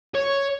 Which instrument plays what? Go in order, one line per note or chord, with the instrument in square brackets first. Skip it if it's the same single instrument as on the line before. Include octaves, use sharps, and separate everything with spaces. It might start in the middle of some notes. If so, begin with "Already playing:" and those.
[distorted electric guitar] C#5